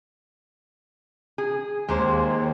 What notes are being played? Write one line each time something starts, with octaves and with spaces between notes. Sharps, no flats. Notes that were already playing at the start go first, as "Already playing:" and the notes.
G#4
D#2 G#3 A#3 C5